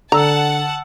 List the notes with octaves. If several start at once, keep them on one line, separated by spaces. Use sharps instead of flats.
D3 F#5 A5 A#5 E6